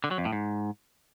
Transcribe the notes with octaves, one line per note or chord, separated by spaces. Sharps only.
D3
F#3
F2
A2
G#2